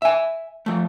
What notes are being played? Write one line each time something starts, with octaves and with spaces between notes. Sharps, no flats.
E5 G#5
F3 A3